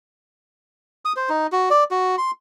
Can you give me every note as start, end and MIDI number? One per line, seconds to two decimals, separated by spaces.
1.05 1.13 87
1.16 1.29 72
1.29 1.47 63
1.52 1.69 66
1.70 1.84 74
1.91 2.16 66
2.18 2.31 84